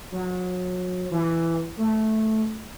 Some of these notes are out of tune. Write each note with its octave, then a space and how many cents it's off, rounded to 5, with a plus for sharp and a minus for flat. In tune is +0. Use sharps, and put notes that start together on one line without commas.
F#3 -30
E3 +10
A3 -10